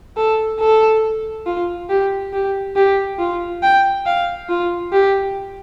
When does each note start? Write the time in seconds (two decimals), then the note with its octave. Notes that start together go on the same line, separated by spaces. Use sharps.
0.17 A4
0.60 A4
1.46 F4
1.90 G4
2.33 G4
2.76 G4
3.19 F4
3.63 G5
4.06 F5
4.49 F4
4.92 G4